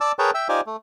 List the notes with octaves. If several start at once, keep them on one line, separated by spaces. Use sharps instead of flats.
D5 A5 D6 E6
G#4 A#4 B4 C#5 G5 A5
E5 G5 E6
D#4 F4 G4 C5 D5 G#5
A3